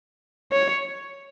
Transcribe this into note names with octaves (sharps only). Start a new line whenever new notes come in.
C#5